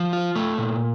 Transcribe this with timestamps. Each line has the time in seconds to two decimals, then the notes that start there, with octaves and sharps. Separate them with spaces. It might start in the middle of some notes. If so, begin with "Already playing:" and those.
Already playing: F3
0.13 F4
0.36 A3
0.58 A#2